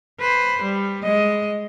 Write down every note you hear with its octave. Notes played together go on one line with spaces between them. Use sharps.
B4 C5
G3
G#3 D#5